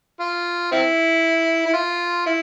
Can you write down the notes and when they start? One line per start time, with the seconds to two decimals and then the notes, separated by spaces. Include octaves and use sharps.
0.20 F4
0.72 C4 E4
1.65 E4
1.74 F4
2.26 E4